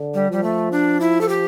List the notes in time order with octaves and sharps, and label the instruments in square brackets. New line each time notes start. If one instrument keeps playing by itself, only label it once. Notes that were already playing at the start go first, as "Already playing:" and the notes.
Already playing: [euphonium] D3
[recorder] G3
[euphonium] F3 [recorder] G3
[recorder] A3
D4
E4
A4
G4